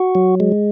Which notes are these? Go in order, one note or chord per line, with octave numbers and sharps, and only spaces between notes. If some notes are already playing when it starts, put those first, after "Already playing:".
Already playing: F#4
F#3
G#3